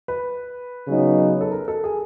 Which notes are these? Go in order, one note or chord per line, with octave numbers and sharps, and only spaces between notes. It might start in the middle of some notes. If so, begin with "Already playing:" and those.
B4
C#3 F#3 B3 D#4
A4
A#4
A4
G#4